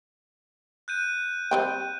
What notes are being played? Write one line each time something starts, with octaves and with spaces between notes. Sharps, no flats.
F#6 G6 D#7
G3 C4 G5